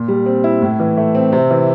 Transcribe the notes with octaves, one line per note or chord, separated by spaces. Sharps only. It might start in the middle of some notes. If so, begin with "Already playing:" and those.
Already playing: A#2
G3
C4
E4
A2
E3
A3
C4
C3
E3